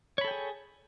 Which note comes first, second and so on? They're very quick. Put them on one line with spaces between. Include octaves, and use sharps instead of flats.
C#5 B5 A4 G5 G#4